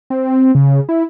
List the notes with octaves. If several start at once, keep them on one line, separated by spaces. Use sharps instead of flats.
C4
C#3
E4